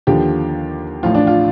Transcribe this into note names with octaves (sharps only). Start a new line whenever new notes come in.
D#2 D3 F3 G4
A1 A2 F3 F4
D4
F4